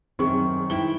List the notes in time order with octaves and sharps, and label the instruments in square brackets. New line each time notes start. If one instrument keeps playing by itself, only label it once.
[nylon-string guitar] F#2 D#3 [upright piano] C4 G#4 C#6
[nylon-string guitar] D#3 E4 G5 [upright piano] G7